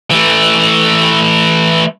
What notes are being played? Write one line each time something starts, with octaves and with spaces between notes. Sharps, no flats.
E3 A3